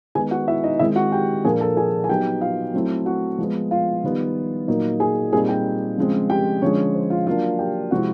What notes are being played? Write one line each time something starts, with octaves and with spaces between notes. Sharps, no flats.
D#3 G#3 B3 D#4 G#4 G#5
F#4 F#5
E4 E5
D#4 D#5
D#3 G#3 C4 E4 E5
F#4 F#5
G4 G5
A#2 F3 A#3 D4 G#4 G#5
A4 A5
G#4 G#5
G#5
F#3 B3 D#4 G4 G5
F4 F5
F#3 A3 C4 E4
F#4 F#5
F3 G#3 B3
F4 F5
D#3 G3 B3 D#4
A#2 F#3 A#3 D#4
G#4 G#5
A#2 G3 C4 D#4 G#4 G#5
G4 G5
C#3 F3 G#3 C4
G4 G5
D3 F3 G#3 C#4 C#5
C5
F4 F5
F#3 A#3 D4 F4 F5
G4 G5
C3 F3 G#3 C4 E4 F#4 F#5